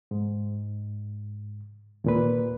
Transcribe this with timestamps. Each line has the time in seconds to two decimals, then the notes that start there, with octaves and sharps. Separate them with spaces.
0.11 G#2
2.04 D#2 A#2 B4